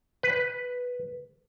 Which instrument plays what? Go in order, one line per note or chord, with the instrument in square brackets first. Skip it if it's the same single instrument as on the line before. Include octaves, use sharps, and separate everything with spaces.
[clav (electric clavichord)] B4